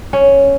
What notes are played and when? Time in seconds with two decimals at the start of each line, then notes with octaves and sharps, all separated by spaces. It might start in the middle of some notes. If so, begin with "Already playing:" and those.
0.13 C#4